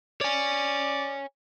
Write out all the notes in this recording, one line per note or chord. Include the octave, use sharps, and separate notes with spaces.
C#5 D5 G#5